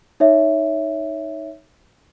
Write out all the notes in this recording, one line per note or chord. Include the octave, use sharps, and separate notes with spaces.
D#4 C#5 E5